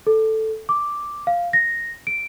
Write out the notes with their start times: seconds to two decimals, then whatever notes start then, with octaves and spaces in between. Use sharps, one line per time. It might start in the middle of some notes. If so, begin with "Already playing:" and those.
0.07 A4
0.69 D6
1.27 F5
1.53 A#6
2.07 D7